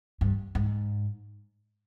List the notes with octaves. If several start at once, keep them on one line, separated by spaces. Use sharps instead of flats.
G2
G#2